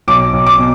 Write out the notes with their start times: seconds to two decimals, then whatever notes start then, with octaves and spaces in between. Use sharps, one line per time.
0.08 B1 D6
0.33 B1
0.47 D6
0.59 B2